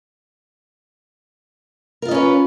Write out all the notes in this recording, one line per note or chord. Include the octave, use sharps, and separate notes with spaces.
C#4 F4 A#4 B4 D#5